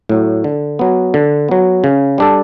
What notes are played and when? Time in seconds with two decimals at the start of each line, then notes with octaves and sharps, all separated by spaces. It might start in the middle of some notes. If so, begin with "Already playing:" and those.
0.09 A2 F#3
0.44 D3
0.79 F#3 B3
1.14 D3
1.48 F#3 B3
1.84 C#3
2.18 G3 D4 A4